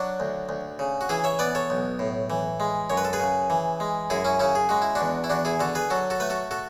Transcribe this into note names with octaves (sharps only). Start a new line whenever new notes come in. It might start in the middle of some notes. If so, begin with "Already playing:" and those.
Already playing: F#3 D4 F#4
D2
D2
C#3
F#4
E3 E4 G#4
C#5 E5
B3 B4 D5
A4 C#5
B1
A2
E3
G#3
F#2 C#5
B4
A4
G#4 B4
C#3
E3
G#3
F#2 E4 G#4
C#4 E4
C#3 C#4 E4
G#4
G#3 F#4
E4
D4 F#4
E2
E4
E2 D4 F#4
E4 G#4
D3 F#4 A4
G#4 B4
F#3 F#4 A4
F#4 A4
A3 B4
F#4 A4
F#4 A4